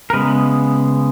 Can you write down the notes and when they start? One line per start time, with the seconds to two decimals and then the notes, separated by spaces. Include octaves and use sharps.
0.10 A#4
0.13 C#3 G#3 B3 B4